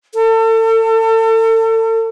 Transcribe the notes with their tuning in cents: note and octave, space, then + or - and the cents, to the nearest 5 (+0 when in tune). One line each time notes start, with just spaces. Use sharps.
A4 +35